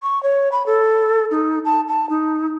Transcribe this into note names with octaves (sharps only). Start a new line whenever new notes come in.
C#6
C#5
B5
A4
D#4
A5
A5
D#4